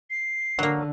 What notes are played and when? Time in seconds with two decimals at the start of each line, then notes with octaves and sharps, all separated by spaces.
0.10 C7
0.59 D3 F#3 A#3